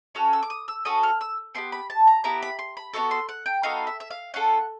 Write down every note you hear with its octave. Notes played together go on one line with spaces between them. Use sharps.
C#4 F#4 A4 F6
E6
D6
D#6
E6
C#4 F#4 A4 D#6
F6
E6
B3 E4 G4 C6
B5
A5
A#5
B3 E4 G4 A#5
B5
C6
B5
B3 D#4 F#4 A4 C#6
C6
F#5
G5
B3 D#4 F#4 A4 F5
E5
E5
F5
C#4 F4 A4 F#5